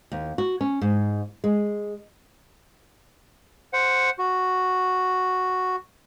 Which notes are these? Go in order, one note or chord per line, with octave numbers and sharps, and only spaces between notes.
D#2
F#4
C#4
G#2
G#3
C5 F#5
F#4